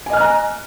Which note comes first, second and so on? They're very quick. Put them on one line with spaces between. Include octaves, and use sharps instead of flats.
G#5 D#5 F6 F#6 A#5